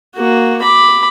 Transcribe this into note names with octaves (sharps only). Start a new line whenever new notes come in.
A#3 F#4
B5 D6